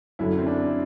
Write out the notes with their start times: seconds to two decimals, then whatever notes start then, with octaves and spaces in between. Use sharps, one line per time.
0.19 F#1 F#2 D3 E4
0.39 C4
0.47 D4